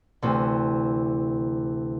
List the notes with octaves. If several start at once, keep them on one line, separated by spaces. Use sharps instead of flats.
D2 C3 E3